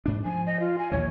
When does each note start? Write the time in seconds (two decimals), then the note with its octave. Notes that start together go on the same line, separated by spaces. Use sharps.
0.06 G#2 D4
0.25 F3 G#5
0.47 D#5
0.60 F4
0.79 G#5
0.92 A#1 D#2 E3 C#5